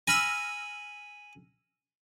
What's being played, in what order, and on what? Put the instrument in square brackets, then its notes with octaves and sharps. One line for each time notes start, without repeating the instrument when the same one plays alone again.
[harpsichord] G#5 B5 [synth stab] E6 F6 A#6